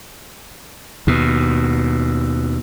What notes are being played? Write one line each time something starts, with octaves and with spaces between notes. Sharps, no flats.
D#2 B2